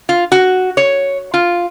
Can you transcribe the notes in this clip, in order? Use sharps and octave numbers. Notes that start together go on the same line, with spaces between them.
F4
F#4
C#5
F4